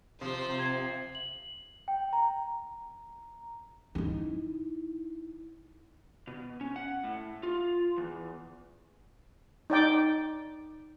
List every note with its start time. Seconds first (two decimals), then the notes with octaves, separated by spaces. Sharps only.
0.21 C3 F3 C5
0.59 G#6 C7
1.15 F#7
1.88 G5
2.13 A#5
3.95 D#4 E4
6.27 B2
6.61 C#4
6.76 F#5
7.04 A2
7.43 F4
7.97 E2
9.70 D#4 D5 G5 D6